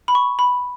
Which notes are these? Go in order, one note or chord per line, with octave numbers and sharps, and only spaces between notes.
B5
C#6
B5